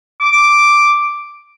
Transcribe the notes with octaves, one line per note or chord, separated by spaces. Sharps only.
D6